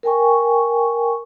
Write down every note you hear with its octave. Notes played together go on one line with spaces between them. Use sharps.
A#4 G5 G#5 C#6